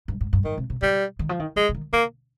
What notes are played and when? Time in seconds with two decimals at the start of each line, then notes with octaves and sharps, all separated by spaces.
0.08 G2
0.21 G#2
0.33 G2
0.45 G#2 D#3
0.58 C3
0.70 C3
0.82 C#3 G3
1.19 D#3
1.29 F3
1.40 D#3
1.56 F3 G#3
1.69 C#3
1.75 D#3
1.93 C#3 A#3